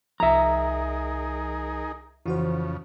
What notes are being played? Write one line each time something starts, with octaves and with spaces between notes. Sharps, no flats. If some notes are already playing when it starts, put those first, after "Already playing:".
C2 F3 D#4 G#4 A#4 E5 A#5
F2 C#3 E3 F#4 C5